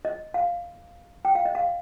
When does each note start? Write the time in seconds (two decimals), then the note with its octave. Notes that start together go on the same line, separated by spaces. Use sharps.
0.05 D#5
0.34 F5
1.25 G5
1.35 F5
1.45 D#5
1.55 F5